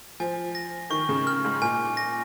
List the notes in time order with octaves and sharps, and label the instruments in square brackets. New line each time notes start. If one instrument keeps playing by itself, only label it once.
[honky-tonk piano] F3 [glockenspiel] G#5
[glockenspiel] A#6
[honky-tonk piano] D#3 [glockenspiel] C#6
[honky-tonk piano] C#3
[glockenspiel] F6
[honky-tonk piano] G#2
[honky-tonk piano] A#2 [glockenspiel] G#5
[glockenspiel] A#6